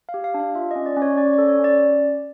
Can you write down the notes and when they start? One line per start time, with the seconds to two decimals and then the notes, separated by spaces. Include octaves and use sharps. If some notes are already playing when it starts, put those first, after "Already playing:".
0.09 F5
0.14 G4
0.24 F5
0.34 D4
0.40 F5
0.55 F4 E5
0.71 D#5
0.76 C#4
0.86 D5
0.97 C#4
1.02 C#5
1.17 C#4 D5
1.33 D5
1.38 A4
1.49 C#5
1.59 C#4
1.64 D5